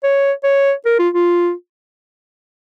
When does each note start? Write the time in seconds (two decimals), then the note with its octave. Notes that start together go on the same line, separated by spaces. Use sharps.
0.03 C#5
0.44 C#5
0.85 A#4
0.99 F4
1.14 F4